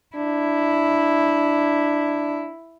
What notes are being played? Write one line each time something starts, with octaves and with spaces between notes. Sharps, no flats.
D4 E4